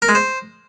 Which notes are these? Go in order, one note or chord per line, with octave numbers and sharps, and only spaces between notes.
A#4
G#3
C5